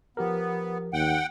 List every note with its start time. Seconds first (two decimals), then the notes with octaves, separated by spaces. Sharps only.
0.17 F3 B3 G4 A#4
0.93 D#2 F#5 G5